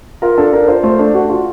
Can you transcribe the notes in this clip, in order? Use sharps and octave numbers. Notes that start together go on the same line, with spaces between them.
F4 A#4
D4 A4
D4 A#4
F4 C5
A3 C5
D4 A4
D4 F#4
F4 F#4